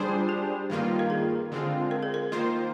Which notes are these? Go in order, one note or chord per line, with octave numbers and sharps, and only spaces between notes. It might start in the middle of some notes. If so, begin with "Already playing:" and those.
Already playing: G3 D4 G#4 C5
F4
G4
G2 D#3 A#3 F4
A#4
G#4
D3 G#3 C4 F4
A#4
G#4
A#4
D#3 A#3 F4 C5